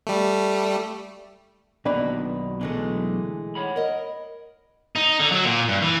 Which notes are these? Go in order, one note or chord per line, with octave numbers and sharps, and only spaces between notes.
G3 A3
B1 B2 D#3 A#3 D4 B4
D3 E3 F#3 G#3 A3
C#5 F#5 B5
A#4 D#5
D#4
D3
F#3
A#2
G2
E3